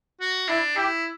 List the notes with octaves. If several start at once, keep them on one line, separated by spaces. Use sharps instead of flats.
F#4
D4 E4
E4 G4